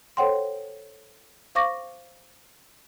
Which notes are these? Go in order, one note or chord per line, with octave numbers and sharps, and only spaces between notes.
A4 C5 C#5 F#5 G5 C6
C5 F5 C#6 D6 A#6